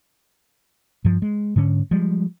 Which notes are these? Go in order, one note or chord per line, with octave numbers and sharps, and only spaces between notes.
G2 F3
G#3
G#2 D3 B3 C#4
F3 G3 G#3